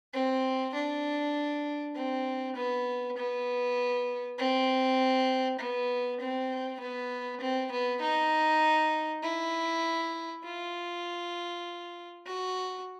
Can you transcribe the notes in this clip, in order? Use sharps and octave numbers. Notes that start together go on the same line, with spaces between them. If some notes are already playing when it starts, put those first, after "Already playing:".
C4
D4
C4
B3
B3
C4
B3
C4
B3
C4
B3
D#4
E4
F4
F#4